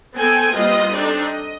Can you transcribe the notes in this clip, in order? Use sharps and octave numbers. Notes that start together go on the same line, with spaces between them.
B3 C4 A4 G5 G#5
G3 A#3 C4 F4 B4 D#5
C4 D4 D#4 A4 D5
D#5